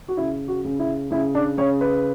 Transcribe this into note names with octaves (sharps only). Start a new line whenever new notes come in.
F#4
C#3 E4
F#4
C#3
E4
C#3 E4
D4
C#3 C#5
B4